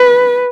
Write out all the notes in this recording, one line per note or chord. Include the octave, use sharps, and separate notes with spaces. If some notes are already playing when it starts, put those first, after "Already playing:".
Already playing: B4